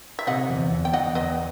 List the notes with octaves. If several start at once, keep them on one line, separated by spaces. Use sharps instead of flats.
E5
C3 D#5 F#5
E2
E2
G5
E2 D#5 F#5
E2 B4 D#5